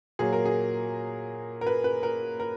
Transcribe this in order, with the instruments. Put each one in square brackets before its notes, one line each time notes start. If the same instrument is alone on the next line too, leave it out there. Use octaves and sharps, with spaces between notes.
[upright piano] A#2 F#3 A#3 G#4
A#4
G#4
A#4
B4
B4
A#4
A#4